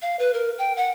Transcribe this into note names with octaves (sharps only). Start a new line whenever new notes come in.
F5
B4
A#4
G5
F#5